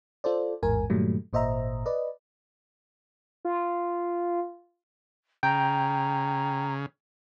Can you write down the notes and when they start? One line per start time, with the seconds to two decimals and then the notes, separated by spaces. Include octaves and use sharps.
0.24 F4 A4 C5 D5
0.63 A1 E2 G#2 A#4 G#5
0.90 G2 A#2 D#3 F#3 G3 A3
1.33 G#1 A#2 C5 D#5 E5 A#5
1.86 B4 D5 D#5
3.45 F4
5.43 C#3 G5 A#5